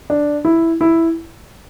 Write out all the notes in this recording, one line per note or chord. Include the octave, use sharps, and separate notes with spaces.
D4
E4
E4